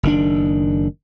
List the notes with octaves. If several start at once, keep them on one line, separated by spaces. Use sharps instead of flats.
F#1 D#3 D4